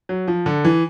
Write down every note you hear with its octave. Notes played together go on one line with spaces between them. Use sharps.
F#3
F3
D3
E3